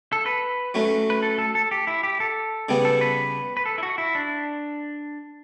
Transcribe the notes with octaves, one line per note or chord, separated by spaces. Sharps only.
A4
B4
F#3 A3 C#4
B4
A4
A4
A4
G4
E4
G4
A4
C#3 G3 B3
A4
B4
B4
A4
E4
F#4
E4
D4